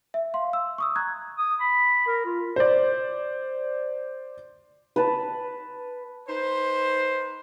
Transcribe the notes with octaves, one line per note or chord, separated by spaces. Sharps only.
E5
F5 C6
E6
C#6 D#6 E6
A#5 F#6 G#6
D#6
B5
A#4
F4
C5 D5
B4 A5
D#4 B4 C5